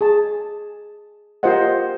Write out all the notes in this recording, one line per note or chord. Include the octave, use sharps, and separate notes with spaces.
G#4 A5
F4 G4 A#4 C5 D#5 F#5